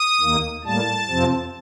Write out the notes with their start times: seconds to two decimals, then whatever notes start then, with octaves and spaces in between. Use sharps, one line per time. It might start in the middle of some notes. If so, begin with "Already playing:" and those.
Already playing: D#6
0.20 D#2 D#3 A#3
0.64 A2 G3 A#3 A5
1.08 F2 C3 F3 C4